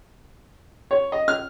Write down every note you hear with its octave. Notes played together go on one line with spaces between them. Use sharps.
C#5
D#5
F6